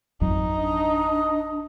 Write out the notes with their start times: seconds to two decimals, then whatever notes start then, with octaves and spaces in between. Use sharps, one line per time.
0.21 G#1 F2 F#3 D#4
0.57 D4 D#5